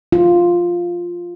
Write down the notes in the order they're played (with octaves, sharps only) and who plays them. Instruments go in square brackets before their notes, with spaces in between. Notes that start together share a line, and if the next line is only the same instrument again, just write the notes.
[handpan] F4